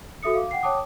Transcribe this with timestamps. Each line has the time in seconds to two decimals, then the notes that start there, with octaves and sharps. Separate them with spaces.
0.23 F#4 A4 E5 D#6 C#7
0.34 F5 D6
0.51 F#5 G5 C7
0.63 C#5 G5 A5 D6 D#6